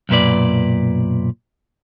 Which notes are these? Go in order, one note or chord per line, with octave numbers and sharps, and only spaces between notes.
B1 F#2 A#2 B4 D5